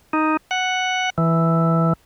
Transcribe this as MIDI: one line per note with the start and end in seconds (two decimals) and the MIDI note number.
0.13 0.37 63
0.51 1.10 78
1.18 1.93 52